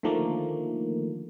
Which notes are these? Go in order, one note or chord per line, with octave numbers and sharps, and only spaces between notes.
D3 D#3 F3 A3 A#3